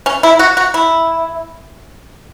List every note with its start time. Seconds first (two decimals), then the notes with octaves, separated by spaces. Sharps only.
0.06 C#4
0.23 E4
0.39 F#4
0.57 F#4
0.74 E4